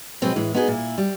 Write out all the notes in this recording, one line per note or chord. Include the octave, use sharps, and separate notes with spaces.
B2 F3 F#3 G#3 C4 B4
A2 E3 G#3
B3 D#4 F#4 G#4 A4 D#5
A#2 E4
G3